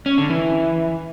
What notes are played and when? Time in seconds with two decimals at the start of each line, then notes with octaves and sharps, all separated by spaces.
0.06 C#4
0.18 D3
0.30 E3